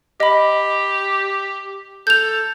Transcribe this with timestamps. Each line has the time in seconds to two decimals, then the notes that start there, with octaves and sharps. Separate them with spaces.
0.20 G4 D#5 B5
2.07 A4 G6 F7